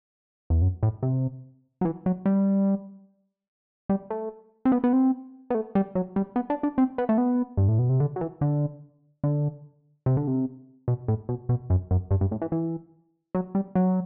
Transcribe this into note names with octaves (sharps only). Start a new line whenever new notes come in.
E2
F#2
A2
C3
F#3
E3
F#3
G3
G3
A3
C4
B3
B3
C4
B3
A3
G3
F#3
G3
B3
D4
D4
C4
B3
A3
B3
G2
A2
B2
C3
D3
F#3
E3
D3
D3
C3
D3
C3
B2
A2
B2
B2
F#2
F#2
G2
G2
A2
E3
E3
F#3
G3
F#3